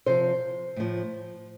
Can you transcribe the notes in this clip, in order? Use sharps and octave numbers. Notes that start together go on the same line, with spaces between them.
C3 F3 C5
A2 F3